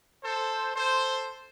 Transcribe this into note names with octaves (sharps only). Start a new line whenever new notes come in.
A4 C5
A4 C5